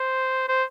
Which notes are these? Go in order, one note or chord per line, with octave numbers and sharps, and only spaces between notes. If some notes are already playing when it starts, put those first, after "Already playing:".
Already playing: C5
C5